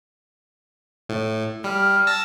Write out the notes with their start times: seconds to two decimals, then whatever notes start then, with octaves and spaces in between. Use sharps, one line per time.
1.09 A2
1.64 G3 F6
2.07 A5 E6 A#6